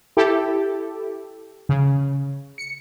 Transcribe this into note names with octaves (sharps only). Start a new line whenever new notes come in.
E4 G4 A4
C#3
C#7